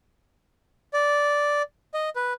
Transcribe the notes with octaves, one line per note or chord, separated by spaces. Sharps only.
D5
D#5
B4